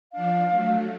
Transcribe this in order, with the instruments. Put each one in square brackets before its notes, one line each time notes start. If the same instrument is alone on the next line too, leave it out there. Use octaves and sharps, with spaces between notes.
[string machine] F3 D4 [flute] F5
[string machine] F#3 A3